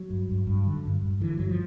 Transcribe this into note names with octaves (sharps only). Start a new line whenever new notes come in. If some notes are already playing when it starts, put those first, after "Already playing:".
Already playing: F#3
G2
G2
G2
D3
G2
G2
D3 E3
G2 F#3
F3